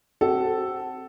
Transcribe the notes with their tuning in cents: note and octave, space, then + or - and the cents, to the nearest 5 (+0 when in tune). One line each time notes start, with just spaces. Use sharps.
C4 +10 F#4 +30 A4 +0